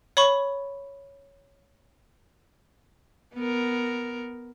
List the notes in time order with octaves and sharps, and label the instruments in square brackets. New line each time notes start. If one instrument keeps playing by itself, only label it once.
[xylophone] C#5 B5 C#6
[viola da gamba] B3 A#4